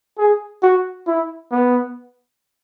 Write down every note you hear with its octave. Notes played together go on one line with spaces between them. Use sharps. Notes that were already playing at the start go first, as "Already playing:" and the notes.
G#4
F#4
E4
B3